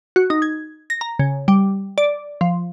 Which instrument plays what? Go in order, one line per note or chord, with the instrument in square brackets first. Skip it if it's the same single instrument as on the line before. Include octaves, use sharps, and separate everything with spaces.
[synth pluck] F#4
D#4
G#6
A#6
A#5
C#3
G3
D5
F3